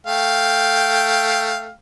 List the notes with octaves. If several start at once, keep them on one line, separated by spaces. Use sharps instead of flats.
A3 F5 G5